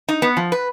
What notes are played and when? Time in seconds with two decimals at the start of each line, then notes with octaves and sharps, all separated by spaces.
0.08 D#4
0.22 B3
0.37 F3
0.52 B4